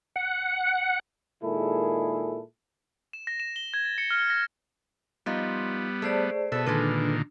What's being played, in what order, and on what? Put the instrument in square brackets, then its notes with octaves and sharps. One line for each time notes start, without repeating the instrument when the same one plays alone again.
[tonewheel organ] F#5
[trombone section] A#2 D#3 G#3 E4 G#4 A4
[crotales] E7
A#6
E7
G7
G#6
A6
C#7
F6
A#6
[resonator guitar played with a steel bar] F3 D#4 F4 [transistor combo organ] G3 B3
[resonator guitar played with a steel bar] A3 [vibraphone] G#4 C5 D5
[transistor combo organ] B2 E5 [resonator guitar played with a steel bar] A4 B4
[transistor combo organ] A#2 D3 D#3 [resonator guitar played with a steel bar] G#3 A4 B4 [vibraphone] D4